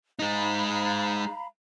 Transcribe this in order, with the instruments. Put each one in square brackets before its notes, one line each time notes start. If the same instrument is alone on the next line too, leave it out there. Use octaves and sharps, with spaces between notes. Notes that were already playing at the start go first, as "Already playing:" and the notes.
[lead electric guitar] G#3 D#4 [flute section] F5 A#5 B5